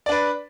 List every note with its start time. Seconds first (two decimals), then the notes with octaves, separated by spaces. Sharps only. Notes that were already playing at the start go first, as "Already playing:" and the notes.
0.06 D5
0.09 D4
0.12 B4